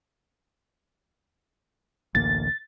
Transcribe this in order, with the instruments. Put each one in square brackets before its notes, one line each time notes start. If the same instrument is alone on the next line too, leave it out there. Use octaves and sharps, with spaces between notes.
[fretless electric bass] A1 D2 A#3 [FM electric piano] A6